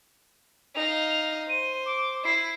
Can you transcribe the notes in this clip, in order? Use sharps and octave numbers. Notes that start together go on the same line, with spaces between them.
D#4 F5 F7
C5 D#7
D6
E4 C7